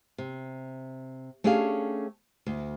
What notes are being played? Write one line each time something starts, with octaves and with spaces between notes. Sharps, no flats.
C3
A3 C#4 D4 G4 G#4 F5
D2